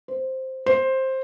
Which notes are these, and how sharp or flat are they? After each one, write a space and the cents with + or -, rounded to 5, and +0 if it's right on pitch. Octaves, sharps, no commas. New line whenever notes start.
C5 +0
C5 +10